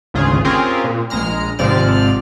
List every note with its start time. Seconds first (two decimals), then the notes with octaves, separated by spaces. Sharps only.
0.14 G#1 D2 C#3 F4 G#4
0.44 C4 C#4 F4 G4 G#4 A#4
0.84 A#2
1.10 A#1 G#3 A#5 F6
1.59 G#1 G#2 C3 F3 D5 F6